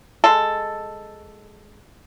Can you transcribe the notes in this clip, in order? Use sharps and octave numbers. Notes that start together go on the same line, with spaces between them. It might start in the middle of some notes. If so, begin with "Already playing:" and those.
G#3 A4